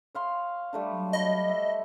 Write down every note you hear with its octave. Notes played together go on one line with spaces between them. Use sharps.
C#5 F5 C6
G3 A3 D4
F#3
C#5 D#5 B5
E5